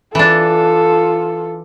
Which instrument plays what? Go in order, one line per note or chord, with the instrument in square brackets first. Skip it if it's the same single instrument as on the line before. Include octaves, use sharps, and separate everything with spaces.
[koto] E3 D4 [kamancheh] F4 A4